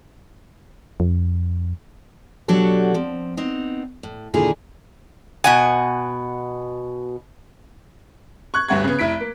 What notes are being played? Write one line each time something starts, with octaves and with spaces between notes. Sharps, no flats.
F2
B2 F#3 D4 F#4 G4 A4
F3 C4
B3 C4 D#4
A2
D#2 A#2 D3 E4 G#4 A#5
B2 F#5 G#5
C#6 F#6 G#6
G1 D2 G2 F#5 C#6 G#6
C#3 B3
F1 E4 B6 D7
A#3